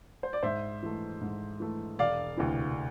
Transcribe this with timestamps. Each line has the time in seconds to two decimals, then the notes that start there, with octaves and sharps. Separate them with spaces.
0.23 C5
0.33 D5
0.43 G#2 C5 E5
0.83 E3 A3
1.21 G#2
1.60 E3 A3
1.99 E1 D5 F5
2.37 D2 C3 E3